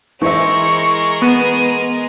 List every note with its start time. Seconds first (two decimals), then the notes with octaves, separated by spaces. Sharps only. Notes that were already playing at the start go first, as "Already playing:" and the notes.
0.22 E3 G#3 A#4 C5 E5 C#6
1.22 B3 D#7